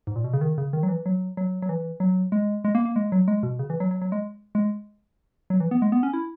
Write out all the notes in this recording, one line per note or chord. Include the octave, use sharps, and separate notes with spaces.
G#2
A#2
B2
C#3
D#3
C#3
D#3
F#3
E3
F#3
F#3
F#3
E3
F#3
G#3
G#3
A#3
A#3
G#3
F#3
G#3
B2
C#3
E3
F#3
F#3
F#3
G#3
G#3
F#3
E3
B3
G#3
B3
C#4
E4